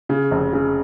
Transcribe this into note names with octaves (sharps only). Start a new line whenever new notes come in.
C#3
F1
C#3